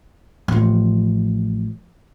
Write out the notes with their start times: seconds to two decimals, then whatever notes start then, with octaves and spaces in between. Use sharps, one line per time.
0.48 A1 F3